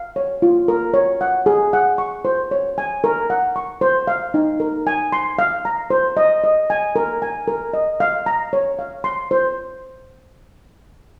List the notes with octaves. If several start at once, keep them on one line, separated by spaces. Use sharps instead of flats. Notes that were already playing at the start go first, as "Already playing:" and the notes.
Already playing: F5
C#5
F4
A#4
C#5
F#5
G#4
F#5
C#6
C5
C#5
G#5
A#4
F#5
C#6
C5
F5
D#4
A#4
G#5
C6
F5
A#5
C5
D#5
D#5
G#5
A#4
G#5
A#4
D#5
F5
A#5
C#5
F5
C6
C5